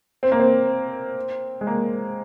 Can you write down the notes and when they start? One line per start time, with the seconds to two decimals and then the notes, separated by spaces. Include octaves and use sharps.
0.23 C4
0.32 A#3
0.40 C4
1.61 G#3
1.67 A#3